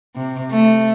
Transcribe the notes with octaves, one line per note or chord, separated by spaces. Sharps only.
C3
A3